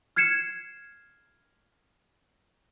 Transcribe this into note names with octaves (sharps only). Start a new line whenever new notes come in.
F6 G#6 C7 C#7 E7